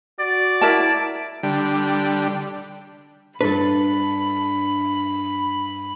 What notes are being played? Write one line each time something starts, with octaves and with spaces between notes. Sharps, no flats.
F#4 D5
E4 A#4 A5
D3 G3
G2 D4 A4 B4 B5